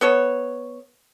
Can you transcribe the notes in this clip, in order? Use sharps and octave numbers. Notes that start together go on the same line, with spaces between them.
B3 A4 C#5